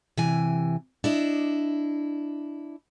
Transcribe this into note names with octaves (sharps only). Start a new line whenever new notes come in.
C3 E3 G#5
D4 E4 D#5